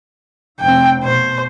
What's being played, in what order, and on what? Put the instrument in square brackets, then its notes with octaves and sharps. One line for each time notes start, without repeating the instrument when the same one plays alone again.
[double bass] F1 C4 [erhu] G5
[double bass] B2 [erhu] C5